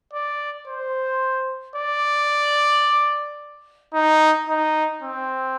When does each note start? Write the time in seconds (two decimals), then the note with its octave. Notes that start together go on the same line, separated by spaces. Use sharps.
0.13 D5
0.67 C5
1.76 D5
3.94 D#4
4.48 D#4
5.02 C4